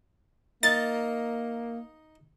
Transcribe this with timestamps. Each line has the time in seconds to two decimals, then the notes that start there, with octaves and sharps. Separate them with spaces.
0.63 A#3 D#4 D#5 A6